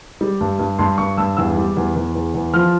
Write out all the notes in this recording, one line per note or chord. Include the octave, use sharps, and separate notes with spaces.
G3
G2
G2
G2 C6
G2 C#6
G2 E6
E2 E6
G3
E2
E2
E2
E2
F3 F6